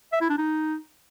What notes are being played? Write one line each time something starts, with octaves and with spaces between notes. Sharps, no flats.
E5
E4
D4
D#4